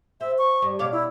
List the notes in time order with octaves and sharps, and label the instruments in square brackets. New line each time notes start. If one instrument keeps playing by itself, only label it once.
[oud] C4 [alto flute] E5
[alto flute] C#6
[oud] G2
[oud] B2 C#5 D5 [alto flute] F5
[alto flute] E4